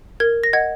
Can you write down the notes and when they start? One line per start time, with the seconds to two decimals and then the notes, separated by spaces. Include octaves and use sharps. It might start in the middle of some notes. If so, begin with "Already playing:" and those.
0.20 A#4 G#6
0.44 A#6
0.53 D#5 F#5 G#6